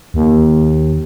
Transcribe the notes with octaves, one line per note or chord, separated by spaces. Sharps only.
D#2